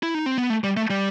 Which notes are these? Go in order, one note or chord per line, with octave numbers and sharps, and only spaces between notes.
E4
D#4
C4
B3
A3
G3
A3
G3